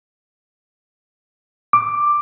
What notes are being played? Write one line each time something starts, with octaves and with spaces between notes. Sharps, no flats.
D6